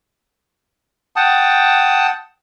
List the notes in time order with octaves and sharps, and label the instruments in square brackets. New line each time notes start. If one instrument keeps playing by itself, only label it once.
[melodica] F#5 G5 A5 D#6